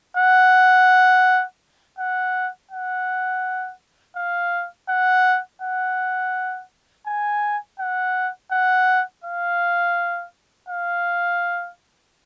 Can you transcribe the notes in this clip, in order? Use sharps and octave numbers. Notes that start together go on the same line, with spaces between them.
F#5
F#5
F#5
F5
F#5
F#5
G#5
F#5
F#5
F5
F5